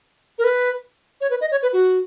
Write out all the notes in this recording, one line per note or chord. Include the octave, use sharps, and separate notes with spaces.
A#4
B4
C#5
B4
D#5
C#5
B4
F#4